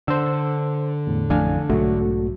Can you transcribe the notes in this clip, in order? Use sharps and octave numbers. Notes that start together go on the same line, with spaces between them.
D3 C5 E6
E2 A2
A1 F2 A2 D4 F5 G#5
B1 G#2 F#3 A3 F#4